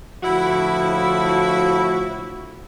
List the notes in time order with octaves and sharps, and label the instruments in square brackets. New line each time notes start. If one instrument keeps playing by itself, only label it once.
[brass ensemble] D2 A2 F3 [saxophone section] E4 F#4